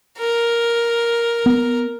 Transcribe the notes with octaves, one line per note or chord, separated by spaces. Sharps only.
A#4
B3